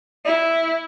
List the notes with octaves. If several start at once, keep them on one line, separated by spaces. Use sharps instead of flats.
E4